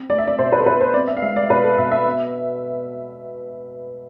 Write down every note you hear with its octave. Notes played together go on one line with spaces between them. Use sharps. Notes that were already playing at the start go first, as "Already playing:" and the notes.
Already playing: C4
A3 D5
E5
D5
B2 C5
B4
A4
B2 B4
C5
C4 D5
E5
F5
G#3 E5
D5
B2 B4
A4
B2 E5
E5
B3